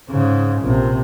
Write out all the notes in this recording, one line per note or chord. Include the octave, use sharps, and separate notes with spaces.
G#2 C#3
A#1 C3